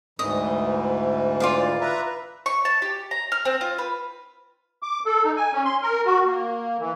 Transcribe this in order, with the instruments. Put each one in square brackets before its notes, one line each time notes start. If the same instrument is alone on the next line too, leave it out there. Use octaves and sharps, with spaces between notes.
[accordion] D2 G#2 E3 [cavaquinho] D#5
[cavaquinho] F4 D5 F5
[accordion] B4 E5 A#5
[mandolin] C#6
A5
G4
A#5
F6
C4
F4
B4
[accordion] D6
A4
D#4
G#5
C#4
C6
A#4
F#4
A#3
E3